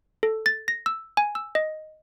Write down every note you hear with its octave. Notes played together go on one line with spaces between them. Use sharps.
A4
A6
A#6
E6
G#5
E6
D#5